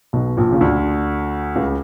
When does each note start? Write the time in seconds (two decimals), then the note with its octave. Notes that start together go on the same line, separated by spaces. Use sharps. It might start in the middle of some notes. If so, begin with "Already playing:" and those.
0.13 B1 B2
0.37 A#1 A#2
0.52 C#3
0.61 D2 D3
1.56 C#2 C#3